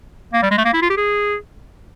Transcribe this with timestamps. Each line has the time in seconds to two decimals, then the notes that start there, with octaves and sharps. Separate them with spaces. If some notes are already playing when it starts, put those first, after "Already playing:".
0.33 A#3
0.43 G3
0.51 G#3
0.58 A3
0.65 A#3
0.73 E4
0.82 F4
0.90 G4
0.97 G#4